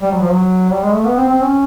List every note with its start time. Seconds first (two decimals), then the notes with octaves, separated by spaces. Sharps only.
0.02 G3
0.12 F#3
0.21 F3
0.31 F#3
0.71 G3
0.83 G#3
0.94 A3
1.06 B3
1.17 C4
1.29 C4
1.41 C#4